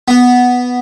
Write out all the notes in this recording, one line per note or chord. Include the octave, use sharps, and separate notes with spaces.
B3